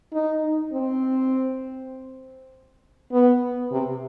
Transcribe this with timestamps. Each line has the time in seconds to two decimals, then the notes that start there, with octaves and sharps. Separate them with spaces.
0.13 D#4
0.73 C4
3.12 B3
3.71 C3